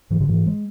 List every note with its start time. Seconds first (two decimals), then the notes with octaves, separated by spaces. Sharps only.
0.10 G#2 E3
0.20 D3
0.29 G#2 E3
0.46 G#3